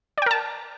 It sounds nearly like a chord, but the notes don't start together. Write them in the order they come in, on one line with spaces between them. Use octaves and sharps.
D5 G5 A#4 A5